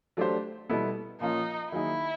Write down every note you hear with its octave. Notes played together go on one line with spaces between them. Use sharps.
F#3 A3 D4 G4 C5
B2 G3 B3 E4 A4
A#2 F3 A#3 C#4 D#4 F4
D#3 F#3 A#3 D#4 E4 G#4